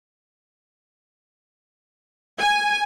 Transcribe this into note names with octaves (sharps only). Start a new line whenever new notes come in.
G#5